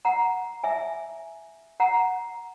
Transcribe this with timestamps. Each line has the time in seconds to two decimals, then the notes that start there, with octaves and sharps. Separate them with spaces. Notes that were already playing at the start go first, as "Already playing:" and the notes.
0.05 F#5 A#5
0.64 E5 G#5
1.80 F#5 A#5